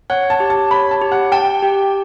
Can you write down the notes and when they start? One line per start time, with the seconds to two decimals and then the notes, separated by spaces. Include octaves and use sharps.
0.10 C#5 F#5
0.30 A5
0.40 G4
0.50 A5
0.71 C#5 B5
0.91 A5
1.02 G4
1.12 F#5
1.32 G5 A5
1.62 G4